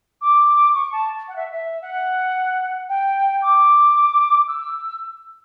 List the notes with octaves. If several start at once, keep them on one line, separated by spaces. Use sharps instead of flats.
D6
C#6
A5
F#5
E5
E5
F#5
G5
D6
E6